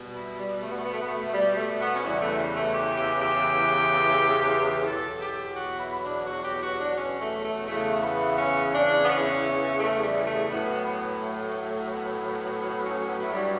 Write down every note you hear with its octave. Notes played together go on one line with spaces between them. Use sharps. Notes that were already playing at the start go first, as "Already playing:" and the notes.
Already playing: B2 G3
E4
G3
A3
B3
A3
B3
A3
B3
A3
A3
G3
A3
B3
C#4
E2 C#3 E3 G3 B3
A3
G3
A3
G4
G4
G4
E2 B2 F#3 A4
G4
F#4
E4
E4
D4
F#4
G4
F#4
D4
C#4
A3
A3
E2 C#3 E3 A3
B3
C#4
D4
B3
C#4
A3
G3
A3
A2 F#3 B3
B3
A3
B3
B3
B3
B3
C#4
B3
A3
G2 F#3 G3